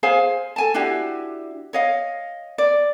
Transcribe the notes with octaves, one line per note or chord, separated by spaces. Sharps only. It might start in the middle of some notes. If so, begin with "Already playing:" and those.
G#4 C5 F5 G#5
A4 G#5 A5
D4 E4 F#4 G4
C#5 D#5 F5
D5